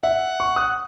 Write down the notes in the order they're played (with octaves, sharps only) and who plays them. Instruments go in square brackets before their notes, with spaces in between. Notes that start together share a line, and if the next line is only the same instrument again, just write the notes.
[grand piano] E5 [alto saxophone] F#5
[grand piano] C#6
D#6 F#6